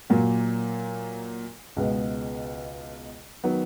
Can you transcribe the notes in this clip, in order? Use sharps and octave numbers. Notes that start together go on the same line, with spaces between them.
A#2 F#3 A#3
C#2 B2 G#3 B3
D#3 F#3 B3